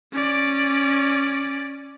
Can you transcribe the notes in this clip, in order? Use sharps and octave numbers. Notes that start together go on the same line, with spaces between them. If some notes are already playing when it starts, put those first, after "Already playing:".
C#4 D5